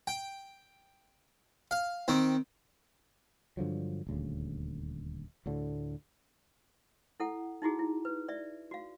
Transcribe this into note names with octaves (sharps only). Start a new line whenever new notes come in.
G5
F5
D#3 C4
G2 D3 F3 F#3
D#1 D2 C#3
D2 A2 D3
E4 A4 F#5
D#4 E4 F#4 G#4
E4
B4
D5 E5
F#4 F5